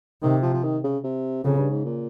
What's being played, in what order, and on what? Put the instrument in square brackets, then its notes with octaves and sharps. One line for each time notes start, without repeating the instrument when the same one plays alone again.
[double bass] C3 [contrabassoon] D#3
[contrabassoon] F3
F3
D#3
C#3
C3
[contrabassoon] F2 [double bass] C#3
[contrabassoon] G2
G#2
A#2